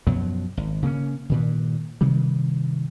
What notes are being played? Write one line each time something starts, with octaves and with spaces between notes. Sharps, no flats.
F#2 B2 F3 F#3
G#1
C#3 A#3 B3 C#4
G2 A#2 D#3
G2 C3 D#3 G3